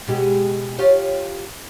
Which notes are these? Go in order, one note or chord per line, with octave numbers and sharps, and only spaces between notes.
B2 G#3 G4
F4 G4 C#5